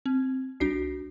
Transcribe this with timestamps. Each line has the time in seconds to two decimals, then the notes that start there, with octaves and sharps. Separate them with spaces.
0.06 C4
0.60 C2 D4 F#4 C7